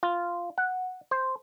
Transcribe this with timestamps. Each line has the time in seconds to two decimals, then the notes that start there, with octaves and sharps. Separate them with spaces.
0.03 F4
0.58 F#5
1.11 C5